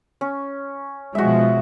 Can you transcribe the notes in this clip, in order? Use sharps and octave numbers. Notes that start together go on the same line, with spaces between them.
C#4
B2 F3 G#3 F#4 E5